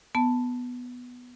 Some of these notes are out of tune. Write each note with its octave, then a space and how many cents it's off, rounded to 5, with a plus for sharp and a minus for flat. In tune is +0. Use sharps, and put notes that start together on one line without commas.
B3 +0 A5 +0